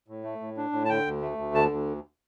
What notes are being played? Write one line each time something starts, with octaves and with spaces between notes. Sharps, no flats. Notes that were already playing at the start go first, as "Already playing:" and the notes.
A2
A3
A2
D4
A2
A5
D3 G5
D2
A3
D2
D3 A5
D2